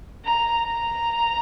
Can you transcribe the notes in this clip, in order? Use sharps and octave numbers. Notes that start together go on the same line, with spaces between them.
A#5
A#5